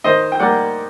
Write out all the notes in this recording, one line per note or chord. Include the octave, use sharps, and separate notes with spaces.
D#3 C5 D#5
G5
G3 A#3 D5 F#5